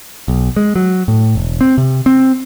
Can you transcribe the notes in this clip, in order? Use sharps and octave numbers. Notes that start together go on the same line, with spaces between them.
B1
G#3
F#3
A2
E1
C4
C3
C4